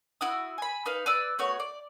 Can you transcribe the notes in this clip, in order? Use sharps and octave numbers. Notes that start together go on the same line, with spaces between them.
E4 F#4 D#6
G#5 B5
D#4 B4 F5
B4 D5 E6
A3 B3 F#4 C#5
D5